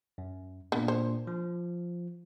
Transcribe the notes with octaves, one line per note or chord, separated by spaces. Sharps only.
F#2
A#2 A#3 B3 D4
C5
F3